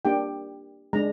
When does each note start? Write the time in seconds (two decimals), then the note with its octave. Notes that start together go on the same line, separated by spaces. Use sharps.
0.05 A#3 D4 G4 G5
0.93 G#3 D4 A#5